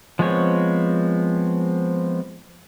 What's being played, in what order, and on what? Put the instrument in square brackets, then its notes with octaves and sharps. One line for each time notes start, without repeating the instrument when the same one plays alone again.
[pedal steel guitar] F3 G#3 B3 C4 C#5